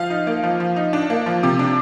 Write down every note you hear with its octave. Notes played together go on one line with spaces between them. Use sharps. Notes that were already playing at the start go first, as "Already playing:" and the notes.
Already playing: F3 F5
D#4
A#3
F3
F3
D#4
D4
A#3
F3
C3
D4